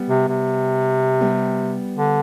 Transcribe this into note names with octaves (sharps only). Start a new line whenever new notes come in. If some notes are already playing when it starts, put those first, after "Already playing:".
Already playing: G3 B3
C3
C3
G3 B3
D3